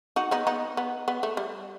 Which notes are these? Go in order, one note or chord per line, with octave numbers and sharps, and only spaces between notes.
D#4 F#4
B3 D#4
B3 D#4
B3
B3
A3
G3